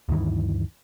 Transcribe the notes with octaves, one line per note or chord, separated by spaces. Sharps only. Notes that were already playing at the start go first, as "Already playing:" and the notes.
D2 G2 D#3 E3